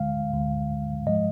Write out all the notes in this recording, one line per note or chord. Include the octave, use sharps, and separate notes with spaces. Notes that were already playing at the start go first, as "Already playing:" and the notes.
Already playing: D2 D3 G#3 F5
D2 D3 G#3
G#2 F3 G#3 D#5